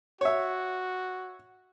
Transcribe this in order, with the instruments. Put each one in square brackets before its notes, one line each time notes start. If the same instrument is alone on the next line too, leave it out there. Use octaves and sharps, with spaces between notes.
[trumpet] F#4 [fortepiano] C#5 E5